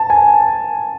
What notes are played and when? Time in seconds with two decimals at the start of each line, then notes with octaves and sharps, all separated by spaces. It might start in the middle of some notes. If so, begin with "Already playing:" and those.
Already playing: A5
0.10 G#5